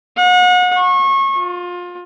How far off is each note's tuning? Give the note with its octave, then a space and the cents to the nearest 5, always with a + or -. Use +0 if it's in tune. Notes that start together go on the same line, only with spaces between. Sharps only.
F#5 -35
C#6 -30
F4 +25